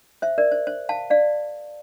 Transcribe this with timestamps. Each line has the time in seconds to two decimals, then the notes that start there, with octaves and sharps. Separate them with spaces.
0.22 C5 E5
0.38 A#4 D5
0.52 C5
0.67 C5
0.89 F5 A5
1.10 D5 F5